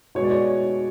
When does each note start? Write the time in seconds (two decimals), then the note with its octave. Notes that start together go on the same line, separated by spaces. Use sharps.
0.15 B2 G#3 B3 C#5
0.24 D5
0.31 C#5